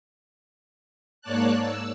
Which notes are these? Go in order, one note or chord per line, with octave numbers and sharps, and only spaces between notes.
G#2 A#3 C#5 D5 A5 F#6
E6